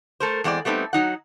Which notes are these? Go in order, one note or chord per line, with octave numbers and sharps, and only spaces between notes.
A3 A4 A#4 C5
E2 G#3 C4 E4 D5
G3 A3 B3 C4 D#4
F#3 D#4 F#5